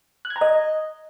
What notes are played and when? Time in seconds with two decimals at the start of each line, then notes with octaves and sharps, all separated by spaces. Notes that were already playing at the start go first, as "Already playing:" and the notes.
0.25 F#6
0.30 G#6
0.36 A#5
0.41 D#5